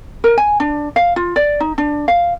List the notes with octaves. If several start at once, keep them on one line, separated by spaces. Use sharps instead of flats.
A#4
G#5
D4
F5
F4
D5
D#4
D4
F5